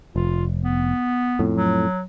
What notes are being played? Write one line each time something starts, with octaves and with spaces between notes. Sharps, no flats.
F1 F4
B3
F2 A2
F#3